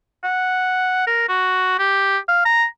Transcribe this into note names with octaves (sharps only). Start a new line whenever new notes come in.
F#5
A#4
F#4
G4
F5
A#5